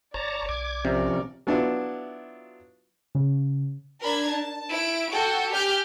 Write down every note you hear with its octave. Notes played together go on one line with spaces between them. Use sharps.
G1 C#5 D5 A5 A#5
B1 D6 G#6
C3 F3 C#4 A#4 D5
F#3 B3 D4 E4 F4
C#3
D4 A#4 B5 G#6
A5
E4 D7
F#4 A4 G5
G4 G#5 F6 G6